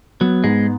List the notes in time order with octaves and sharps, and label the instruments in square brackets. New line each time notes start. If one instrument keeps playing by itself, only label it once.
[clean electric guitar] F#3 [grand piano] B3
[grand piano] G#2 [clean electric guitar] G#3